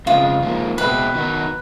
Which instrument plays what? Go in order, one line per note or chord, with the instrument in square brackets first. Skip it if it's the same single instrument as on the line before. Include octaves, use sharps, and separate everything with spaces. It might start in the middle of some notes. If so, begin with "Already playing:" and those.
[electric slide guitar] F2 C#3 F3 G#3 [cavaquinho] F4
[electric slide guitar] G#2 F3 A#3
[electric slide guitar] B2 G#3 C4 E4 [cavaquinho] B4
[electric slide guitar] D#3 F#3 B3 D#4